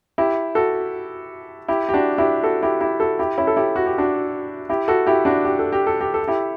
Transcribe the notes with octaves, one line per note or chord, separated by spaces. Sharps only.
E4 G4
F#4 A4
E4 G4
G4
D4 F#4
E4 G4
F#4 A4
E4 G4
E4 G4
F#4 A4
E4 G4
C#4 E4
A4
E4 G4
F#4
G4
D4 F#4
E4 G4
F#4 A4
E4 G4
D4 F#4
G4
A4
G4
A4
G4
A4
E4 G4